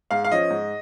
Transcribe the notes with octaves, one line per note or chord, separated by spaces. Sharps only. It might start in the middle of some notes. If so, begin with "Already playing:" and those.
G#2 F5
F5
F3 C#4 D#5
G#2